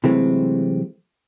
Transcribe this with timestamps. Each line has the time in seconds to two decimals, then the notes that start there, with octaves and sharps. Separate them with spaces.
0.04 C3 E3 F#3 G#3 A3 C4